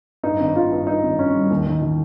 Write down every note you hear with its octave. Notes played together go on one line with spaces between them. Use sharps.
G2 D#4
G#1
G#1 F4
G2
G2 D#4
G#1
G#1 C#4
G3
D#2
D#3
D#3